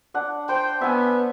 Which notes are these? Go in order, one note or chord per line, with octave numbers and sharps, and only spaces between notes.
D4 F#5
C5 G5
B3 E5 G#5